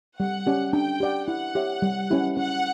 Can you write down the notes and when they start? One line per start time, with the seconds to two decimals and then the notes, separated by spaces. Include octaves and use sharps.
0.19 G3 F#5
0.47 C#4 G4 D5
0.73 D4 G5
1.00 G4 D5 F#5
1.28 E4 F#5
1.55 G4 C#5 E5
1.82 G3
2.10 C#4 E4 G4
2.37 C#4 F#5